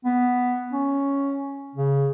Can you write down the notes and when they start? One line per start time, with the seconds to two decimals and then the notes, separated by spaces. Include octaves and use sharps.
0.05 B3
0.72 C#4
1.75 C#3